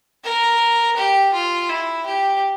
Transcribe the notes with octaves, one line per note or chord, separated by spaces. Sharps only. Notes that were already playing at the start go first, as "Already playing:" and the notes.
A#4
G4
F4
E4
G4